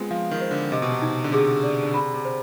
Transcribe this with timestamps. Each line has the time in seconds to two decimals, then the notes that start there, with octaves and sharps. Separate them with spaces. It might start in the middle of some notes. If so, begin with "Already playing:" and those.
Already playing: G#3 B3 C4 F4
0.11 F3 F5
0.31 D#3
0.41 C5
0.51 D3
0.72 C3 D#5
0.82 B2
0.92 C3
1.02 D#4
1.24 D3
1.32 C3 G#4
1.63 D5
1.83 D3
1.94 C3 B5
2.14 C3
2.25 C5